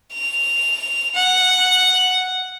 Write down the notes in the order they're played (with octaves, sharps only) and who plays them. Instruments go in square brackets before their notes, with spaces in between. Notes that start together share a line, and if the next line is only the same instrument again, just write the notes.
[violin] F7
F#5